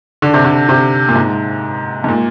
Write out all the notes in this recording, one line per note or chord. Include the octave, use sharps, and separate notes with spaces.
D3
C3
D3
C3
A#2
G#2
G#2
A#2